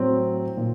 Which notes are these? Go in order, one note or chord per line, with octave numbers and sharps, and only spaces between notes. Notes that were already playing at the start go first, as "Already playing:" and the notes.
Already playing: A2 F#3 C4
A#2